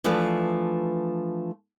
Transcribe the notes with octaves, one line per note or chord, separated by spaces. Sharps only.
E3 F3 A3 D4 B4